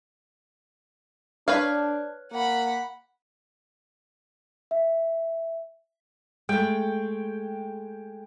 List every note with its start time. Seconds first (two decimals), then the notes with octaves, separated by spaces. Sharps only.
1.48 D4 B4 C#5 F5
2.32 A#3 F#5 B5
4.71 E5
6.49 G#3 A3 G5